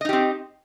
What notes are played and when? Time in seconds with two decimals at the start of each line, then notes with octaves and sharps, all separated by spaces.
0.01 D#5
0.05 D#4
0.09 G4
0.13 C4